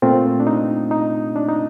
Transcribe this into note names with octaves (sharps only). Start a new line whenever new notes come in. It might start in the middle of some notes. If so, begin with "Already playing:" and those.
A#2 A3 C4 F4
D4
D#4
D#4
D4
D#4